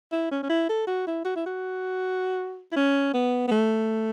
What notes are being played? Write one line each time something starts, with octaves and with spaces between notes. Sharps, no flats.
E4
C#4
C#4
E4
A4
F#4
E4
F#4
E4
F#4
E4
C#4
B3
B3
A3